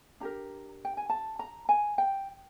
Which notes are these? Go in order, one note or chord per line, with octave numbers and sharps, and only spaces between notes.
D4 G4 A#4 A#5
G5
G#5
A5
A#5
G#5
G5